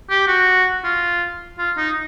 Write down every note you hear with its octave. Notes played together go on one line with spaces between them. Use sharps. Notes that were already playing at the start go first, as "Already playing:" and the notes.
G4
F#4
F4
F4
D#4